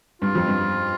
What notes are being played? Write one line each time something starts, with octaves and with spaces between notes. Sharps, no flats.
G2 F4
F2
G2